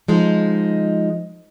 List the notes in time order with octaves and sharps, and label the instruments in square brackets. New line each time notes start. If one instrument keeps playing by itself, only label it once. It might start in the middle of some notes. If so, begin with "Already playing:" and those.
[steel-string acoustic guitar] F3 G#3 D#4